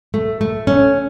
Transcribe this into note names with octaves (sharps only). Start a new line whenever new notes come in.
A3
A3
C#4